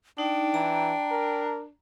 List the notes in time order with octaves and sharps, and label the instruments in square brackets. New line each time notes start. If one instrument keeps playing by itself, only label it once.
[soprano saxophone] D4 [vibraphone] D#4 [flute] G5
[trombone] E3 [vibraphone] A#5
[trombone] A#4